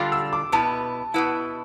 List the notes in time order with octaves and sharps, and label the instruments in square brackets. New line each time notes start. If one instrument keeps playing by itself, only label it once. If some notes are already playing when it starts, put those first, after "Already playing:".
Already playing: [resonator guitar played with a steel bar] D3 G3 D4 F4 [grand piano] C6 D6
[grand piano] E6
D6
[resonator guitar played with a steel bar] B2 B3 E4 [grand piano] A5
[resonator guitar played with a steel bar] B2 B3 E4